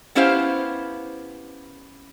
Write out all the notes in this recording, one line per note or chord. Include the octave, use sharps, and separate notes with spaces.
B3 C#4 E4 G4 C5 F5